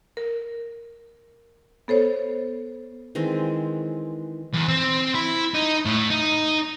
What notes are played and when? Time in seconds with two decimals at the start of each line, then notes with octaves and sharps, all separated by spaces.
0.17 A#4
1.88 B3 A4 C5 C#5
3.15 D#3 E3 G#3 C4
4.53 E2
4.68 C4
5.15 E4
5.54 D#4
5.85 A2
6.10 D#4